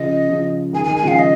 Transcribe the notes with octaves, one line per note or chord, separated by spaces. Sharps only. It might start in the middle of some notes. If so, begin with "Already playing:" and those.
Already playing: C#3 F3 D#5
C#3 F3
D#3 G#3 G#5
G#5
D#3 G#3
G#5
C#3 F3 F5
D#5